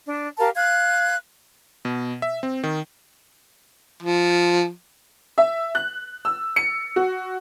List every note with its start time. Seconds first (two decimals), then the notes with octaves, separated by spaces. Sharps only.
0.05 D4
0.39 G4 A#4 F5 A5
0.56 F5 F#6 G#6
1.85 B2
2.22 E5
2.43 C4
2.64 D#3
4.03 F3
5.38 E5
5.75 F#6
6.25 E6
6.56 C#7
6.96 F#4